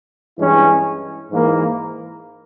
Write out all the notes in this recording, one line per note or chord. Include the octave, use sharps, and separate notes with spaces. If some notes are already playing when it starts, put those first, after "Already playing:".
G2 E3 G#3 C#4 E4
G#2 E3 A#3